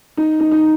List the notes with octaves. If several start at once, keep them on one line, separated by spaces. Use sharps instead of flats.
D#4
D#4
D#4